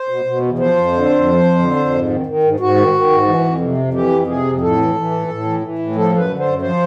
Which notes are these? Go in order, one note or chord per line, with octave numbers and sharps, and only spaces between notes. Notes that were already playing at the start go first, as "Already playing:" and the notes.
Already playing: C5
B2
B2
E2
F3 C5
F2
D3
F2
F3
F2
D3
F2
G#2
D#3
D#3
G#2
G#2 F#4
D#3
D#3
G#2
E3
F2
C3
F2
E3 G4
F2
C3 G#4
F2
A2 A4
E3
E3
A2
A2
E3
E3
A2
F3 A4
F#2
B4
D3
C5
F#2
F3 C5